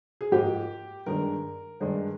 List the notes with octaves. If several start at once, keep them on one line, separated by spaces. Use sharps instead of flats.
G#4
G#2 F3 A#3 G4
G2 D#3 G#3 D4 A#4
G2 D#3 G#3 D4